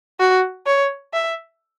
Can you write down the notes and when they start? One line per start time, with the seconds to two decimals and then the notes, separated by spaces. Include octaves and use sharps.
0.20 F#4
0.66 C#5
1.13 E5